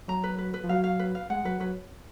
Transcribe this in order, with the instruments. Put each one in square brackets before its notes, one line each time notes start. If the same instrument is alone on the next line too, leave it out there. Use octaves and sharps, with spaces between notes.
[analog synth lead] F#3 [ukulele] A#5
[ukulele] B4
B4
B4
[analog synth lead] F3
[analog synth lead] F#3 [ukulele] F5
[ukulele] F5
B4
F5
[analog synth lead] G#3 [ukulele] F#5
[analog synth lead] F#3 [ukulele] B4
[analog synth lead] F#3 [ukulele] B4